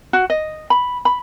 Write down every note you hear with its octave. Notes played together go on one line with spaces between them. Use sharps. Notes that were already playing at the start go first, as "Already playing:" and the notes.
F#4
D#5
B5
B5